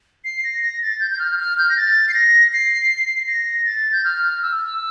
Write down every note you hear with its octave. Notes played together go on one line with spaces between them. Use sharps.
C7
A#6
A#6
A6
G6
G6
F6
F6
G6
A#6
A6
C7
A#6
C7
A#6
A6
G6
F6
E6